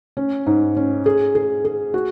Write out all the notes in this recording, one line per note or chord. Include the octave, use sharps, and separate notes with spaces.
C#4
G#2
C#4
G#4
G#4
G#4
F#4